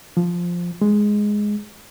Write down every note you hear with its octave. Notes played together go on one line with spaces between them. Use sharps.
F3
G#3